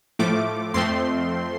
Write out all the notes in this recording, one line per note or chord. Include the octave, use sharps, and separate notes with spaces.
A2 F3 A3 D6
F2 F3 A3 C4 C6